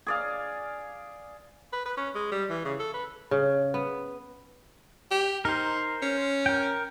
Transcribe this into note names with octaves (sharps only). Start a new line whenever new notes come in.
G#4 D5 F5
B4
B4
C#4
G#3
G3
E3
C#3
A4
B4
C#3
B3
G4
D#4 A#4 C5
C#4
A#4 G5